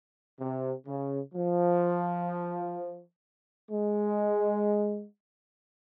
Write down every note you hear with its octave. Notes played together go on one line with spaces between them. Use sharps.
C3
C#3
F3
G#3